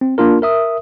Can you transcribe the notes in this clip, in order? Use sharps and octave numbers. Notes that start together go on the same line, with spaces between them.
C4
A#3 D4 F4 A#4
A#4 E5 D#6